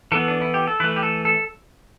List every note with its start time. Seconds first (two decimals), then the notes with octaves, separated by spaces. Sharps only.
0.12 E3 B3 A4
0.28 D4
0.42 E4
0.54 G4
0.67 A4
0.80 E3 A3 B4
0.96 G4
1.03 A4
1.25 A4